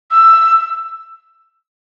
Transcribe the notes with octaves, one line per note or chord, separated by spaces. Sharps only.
E6